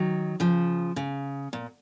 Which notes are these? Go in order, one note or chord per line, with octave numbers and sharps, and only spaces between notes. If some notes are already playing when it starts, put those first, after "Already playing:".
Already playing: D#3 F#3
C#3 F3
C#3
A#2